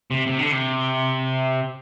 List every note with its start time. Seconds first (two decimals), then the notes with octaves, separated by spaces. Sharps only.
0.11 C3
0.27 C3
0.38 D3
0.51 C3